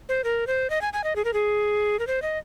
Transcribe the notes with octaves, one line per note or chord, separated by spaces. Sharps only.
C5
A#4
C5
D#5
G#5
G#5
D#5
G#4
A#4
G#4
A#4
C5
D#5